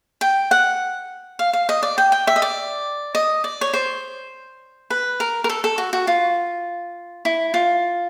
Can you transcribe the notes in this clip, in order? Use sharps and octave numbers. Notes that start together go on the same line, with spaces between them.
G5
F#5
F5
F5
D#5
D5
G5
G5
E5
D#5
D5
D#5
D5
C#5
C5
B4
A#4
A#4
A4
A4
F#4
F#4
F4
E4
F4